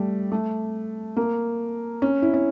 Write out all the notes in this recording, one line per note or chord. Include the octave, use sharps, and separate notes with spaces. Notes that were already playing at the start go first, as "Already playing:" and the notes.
Already playing: G3 A3
A3
A#3
C#4
E4
C#4